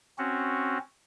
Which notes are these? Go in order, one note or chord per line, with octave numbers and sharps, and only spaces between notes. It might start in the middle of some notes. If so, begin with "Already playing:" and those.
C4 C#4 F#4